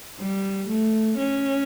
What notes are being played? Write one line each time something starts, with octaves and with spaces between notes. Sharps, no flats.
G3
A3
C#4